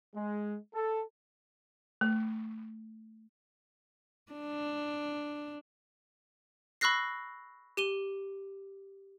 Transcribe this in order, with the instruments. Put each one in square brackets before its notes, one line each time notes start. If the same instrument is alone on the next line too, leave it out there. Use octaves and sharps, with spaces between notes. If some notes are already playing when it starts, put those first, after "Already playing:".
[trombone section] G#3
A4
[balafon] A3
[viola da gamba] D4
[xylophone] B5 C#6 E6 F#6 A#6 C7
G4 D#7 G7